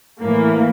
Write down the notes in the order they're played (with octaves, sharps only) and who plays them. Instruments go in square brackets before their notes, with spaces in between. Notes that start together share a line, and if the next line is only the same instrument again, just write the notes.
[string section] A2 E3 A#3